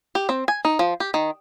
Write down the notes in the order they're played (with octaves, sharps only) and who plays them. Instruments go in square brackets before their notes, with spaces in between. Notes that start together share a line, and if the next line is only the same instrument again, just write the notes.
[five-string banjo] G4
C4
G#5
D#4
F3
G4
D#3